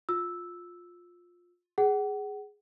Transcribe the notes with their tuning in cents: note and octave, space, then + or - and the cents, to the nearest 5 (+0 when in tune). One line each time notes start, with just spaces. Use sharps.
F4 +15 E6 -5
G#4 +0 F#5 +30